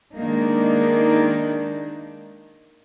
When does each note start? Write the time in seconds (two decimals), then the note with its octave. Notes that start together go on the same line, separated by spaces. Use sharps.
0.15 D#3 G#3 A#3 D4 D#4